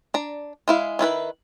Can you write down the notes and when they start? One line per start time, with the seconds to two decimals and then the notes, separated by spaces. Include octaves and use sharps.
0.14 D4 A#5
0.68 G#3 E4 F5
0.99 D#3 E4 F4 B4